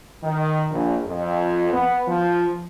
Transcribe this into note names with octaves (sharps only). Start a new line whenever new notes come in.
D#3
A#1
F2
B3
F3